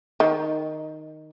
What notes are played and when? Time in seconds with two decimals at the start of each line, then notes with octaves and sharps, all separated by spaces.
0.20 D#3